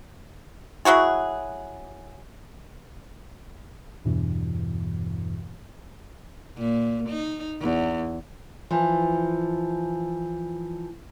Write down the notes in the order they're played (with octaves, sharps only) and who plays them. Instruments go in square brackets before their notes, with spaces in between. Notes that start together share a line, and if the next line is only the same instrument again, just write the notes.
[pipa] F#3 E4 F#4 G#4
[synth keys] E2 G2 B2 E3
[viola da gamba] A#2
D#4
E2
[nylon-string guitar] E3 F3